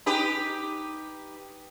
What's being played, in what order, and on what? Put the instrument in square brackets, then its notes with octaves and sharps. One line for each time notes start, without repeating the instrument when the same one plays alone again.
[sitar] D#4 G4 B4